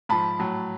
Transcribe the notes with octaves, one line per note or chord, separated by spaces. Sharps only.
G#2 F3 A5 B5
A2 F#3